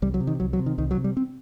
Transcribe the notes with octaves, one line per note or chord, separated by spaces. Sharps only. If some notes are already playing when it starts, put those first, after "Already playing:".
C2 G3
F#3
C3
D#3
C2 F#3
F#3
C3
D#3
C2 D#3
F#3
C3
G3
C4